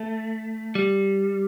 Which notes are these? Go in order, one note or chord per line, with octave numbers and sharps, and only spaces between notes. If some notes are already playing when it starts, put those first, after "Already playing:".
Already playing: A3
G3